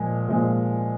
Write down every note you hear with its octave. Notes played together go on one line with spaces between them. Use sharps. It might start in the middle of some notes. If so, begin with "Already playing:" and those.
Already playing: A#2 F3 G#3
A#2 F3 G#3